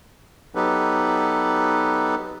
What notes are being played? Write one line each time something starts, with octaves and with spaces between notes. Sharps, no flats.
F#3 B3 D#4 G4 A4 B4